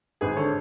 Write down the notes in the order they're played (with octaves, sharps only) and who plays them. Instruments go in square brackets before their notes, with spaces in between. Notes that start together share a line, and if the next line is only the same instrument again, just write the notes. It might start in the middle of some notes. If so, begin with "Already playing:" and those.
[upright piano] G#1 G#4 B4
D3 A4 C#5